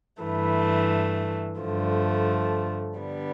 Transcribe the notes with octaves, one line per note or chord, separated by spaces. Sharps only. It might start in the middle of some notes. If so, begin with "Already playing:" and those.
G2 E3 A3
G2 D3 F3 A3
D3 G3 B3